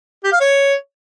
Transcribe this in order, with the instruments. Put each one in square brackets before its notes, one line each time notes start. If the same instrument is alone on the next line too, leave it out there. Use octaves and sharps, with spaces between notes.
[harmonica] G4
F5
C#5